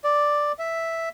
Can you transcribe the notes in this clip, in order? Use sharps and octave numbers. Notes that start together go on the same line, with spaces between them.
D5
E5